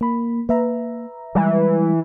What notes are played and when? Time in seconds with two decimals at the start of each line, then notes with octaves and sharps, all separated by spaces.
0.01 A#3 B5
0.49 A#3 B4 E5 A#5
1.35 E3 G3 G#3